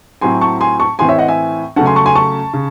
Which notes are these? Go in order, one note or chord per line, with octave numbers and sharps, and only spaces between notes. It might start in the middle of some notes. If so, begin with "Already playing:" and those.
A2 F#3 C4 G#5 C6
A5 C#6
G#5 C6
A5 C#6
A2 E3 C4 G#5 C6
C#5 E5
D#5 F#5
E5 G#5
C#3 F#3 A3 C#4 F#5 A5
G#5 C6
A5 C#6
G#5 C6
A5 C#6
C#3